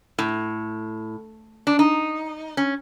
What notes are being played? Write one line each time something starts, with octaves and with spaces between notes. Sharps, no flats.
A2
D4
D#4
C#4